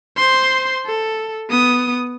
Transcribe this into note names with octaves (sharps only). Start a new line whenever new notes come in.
C5 C6
A4
B3 D#6